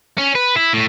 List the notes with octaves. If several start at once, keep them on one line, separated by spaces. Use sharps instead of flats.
C#4
B4
E4
A2